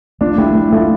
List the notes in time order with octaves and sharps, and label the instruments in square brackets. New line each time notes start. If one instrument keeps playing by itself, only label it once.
[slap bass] A3 [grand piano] D4 F4
[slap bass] A3 [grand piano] E4 G4
[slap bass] A3
[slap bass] A3 [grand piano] F4 A4